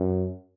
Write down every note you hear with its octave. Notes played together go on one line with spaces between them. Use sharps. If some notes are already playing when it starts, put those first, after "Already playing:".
Already playing: F#2